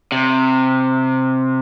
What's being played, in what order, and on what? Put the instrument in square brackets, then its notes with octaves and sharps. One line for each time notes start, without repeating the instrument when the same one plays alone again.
[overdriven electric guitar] C3